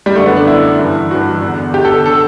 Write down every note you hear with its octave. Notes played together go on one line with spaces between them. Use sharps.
G3
F#2 D3 A3
B3
D4
F#2 D3 E4
G2 E3
G2 E3 F#4
E2 D3
E2 D3 G4
A4
D3 A4